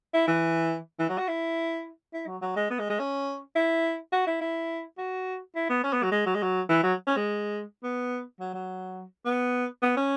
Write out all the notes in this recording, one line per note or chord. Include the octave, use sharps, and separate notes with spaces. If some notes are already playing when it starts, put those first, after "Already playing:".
E4
E3
E3
F#3
F#4
E4
E4
F#3
F#3
G#3
B3
G#3
G#3
C#4
E4
F#4
E4
E4
F#4
E4
B3
C#4
B3
F#3
G#3
F#3
G#3
F#3
E3
F#3
C#4
G#3
B3
F#3
F#3
B3
B3
C#4